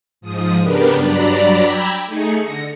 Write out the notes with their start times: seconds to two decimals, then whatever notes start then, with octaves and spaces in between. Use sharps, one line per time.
0.21 G#2 F3 D#6
0.59 C#3 B3 D4 G4 A#4 B4
0.95 G2 F#3 D4 D5 A#5 B5
1.62 G5 A#5 B5 D6 E6 G#6
2.06 A3 D#4 G#4 C#7
2.39 D3 A#6 C#7